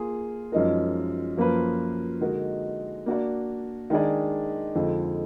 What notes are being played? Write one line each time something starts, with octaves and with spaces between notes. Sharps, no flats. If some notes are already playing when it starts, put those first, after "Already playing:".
Already playing: A#3 F4 G#4
F#2 F3 G#3 D#4 A#4
F#2 F3 A#3 F4 B4
D3 G#3 D#4 F#4 A#4
A#3 D4 F#4 D5
D#3 G#3 D4 G#4 D5
F2 D3 G#3 D#4